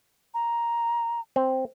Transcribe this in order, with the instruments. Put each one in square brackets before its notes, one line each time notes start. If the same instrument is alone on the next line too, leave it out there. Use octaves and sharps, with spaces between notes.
[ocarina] A#5
[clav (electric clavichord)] C4